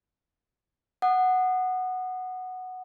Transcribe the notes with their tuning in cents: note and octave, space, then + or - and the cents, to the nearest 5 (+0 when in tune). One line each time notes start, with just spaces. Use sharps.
F#5 +0 D#6 -30